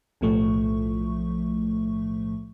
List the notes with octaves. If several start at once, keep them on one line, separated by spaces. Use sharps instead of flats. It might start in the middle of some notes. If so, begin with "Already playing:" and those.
B1 A2 F3 A3 C#6